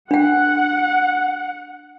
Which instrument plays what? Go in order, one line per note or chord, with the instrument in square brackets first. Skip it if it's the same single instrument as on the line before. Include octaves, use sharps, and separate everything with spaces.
[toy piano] D4 G5 [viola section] F#5